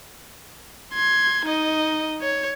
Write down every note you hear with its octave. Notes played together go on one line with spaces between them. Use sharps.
C6 G#6
D#4 D#5
C#5